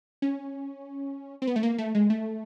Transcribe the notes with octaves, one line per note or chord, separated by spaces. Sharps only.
C#4
C4
B3
A3
A#3
A3
G#3
A3